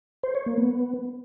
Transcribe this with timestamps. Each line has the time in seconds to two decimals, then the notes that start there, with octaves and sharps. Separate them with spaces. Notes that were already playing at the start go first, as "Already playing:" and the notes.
0.23 C5
0.35 C#5
0.46 A#3
0.58 B3